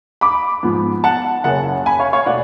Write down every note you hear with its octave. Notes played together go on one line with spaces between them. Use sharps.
B5 D6
G#2 F3 B3
F#5 A5
F#1 F#2 C#3 F#5 A5
G#5 B5
C#5 F5
C#5 F5
B2 A3 D5 F#5